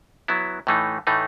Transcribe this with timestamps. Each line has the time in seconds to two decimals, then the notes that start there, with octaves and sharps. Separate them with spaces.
0.28 F#3 B3 E4
0.67 A2 E3 A3 D#4
1.07 A2 E3 A3 D#4